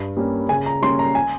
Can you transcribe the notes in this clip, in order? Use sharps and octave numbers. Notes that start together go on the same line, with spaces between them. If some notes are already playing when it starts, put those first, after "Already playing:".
Already playing: G2
G3 A#3 C#4
C#3 G#5
A#5
G3 A#3 C#4 C6
A#5
G#5